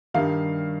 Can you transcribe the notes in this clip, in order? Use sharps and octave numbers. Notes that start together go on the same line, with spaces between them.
G2 D#3 G3 F5